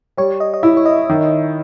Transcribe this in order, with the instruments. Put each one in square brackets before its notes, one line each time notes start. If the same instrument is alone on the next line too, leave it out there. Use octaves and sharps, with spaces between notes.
[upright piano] G3 [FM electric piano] C#5
[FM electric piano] D#5
D#5
[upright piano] E4 [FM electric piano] E5
[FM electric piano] C#5
D#5
[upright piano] D#3